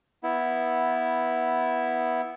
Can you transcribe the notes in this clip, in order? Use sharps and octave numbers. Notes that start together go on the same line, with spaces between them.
B3 E4